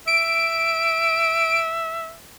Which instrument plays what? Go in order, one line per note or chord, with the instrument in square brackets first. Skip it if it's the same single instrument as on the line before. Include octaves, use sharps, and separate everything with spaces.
[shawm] E5 [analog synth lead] D7